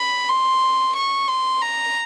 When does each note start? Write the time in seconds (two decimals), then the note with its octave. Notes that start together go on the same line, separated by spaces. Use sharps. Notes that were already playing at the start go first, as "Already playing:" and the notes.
Already playing: B5
0.29 C6
0.95 C#6
1.28 C6
1.62 A#5